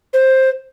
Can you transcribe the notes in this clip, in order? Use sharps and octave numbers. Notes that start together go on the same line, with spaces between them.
C5